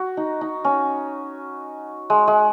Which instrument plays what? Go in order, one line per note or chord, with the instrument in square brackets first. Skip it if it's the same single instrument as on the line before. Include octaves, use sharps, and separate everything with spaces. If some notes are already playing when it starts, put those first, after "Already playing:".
Already playing: [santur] F#4
D#4
D#4
C#4
G#3
G#3